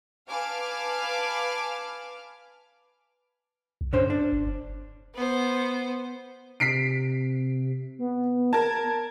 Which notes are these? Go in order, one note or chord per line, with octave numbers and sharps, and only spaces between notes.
B4 F5 G#5 A5 D6 F6
C2
G2 D3 C#4 C5
D4
F#1
B3 C5
C3 B6 C7 D7
B3
A#4 A5 G#6